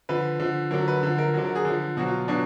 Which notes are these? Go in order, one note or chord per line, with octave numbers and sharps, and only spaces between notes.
D3 F3 B4
D3 F3
D3 F#3 A#4
B4
D3 F3
A#4
D3 F#3 F#4
A#4
G#4
D3
F3
B2 F#3 F#4
F4
B2 F#3 D4